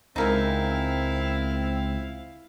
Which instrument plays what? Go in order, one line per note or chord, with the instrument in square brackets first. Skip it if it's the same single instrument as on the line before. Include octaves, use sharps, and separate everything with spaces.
[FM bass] C#2 [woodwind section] C4 [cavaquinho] D#4 A#4 G#5 [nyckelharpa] E4 F5